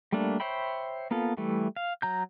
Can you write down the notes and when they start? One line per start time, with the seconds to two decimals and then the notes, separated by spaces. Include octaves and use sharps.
0.12 G3 A3 A#3 D4
0.40 C5 C#5 E5 G5 B5
1.11 A#3 B3 F4 A4
1.37 E3 G3 A3
1.76 F5
2.02 F#3 A#5 G6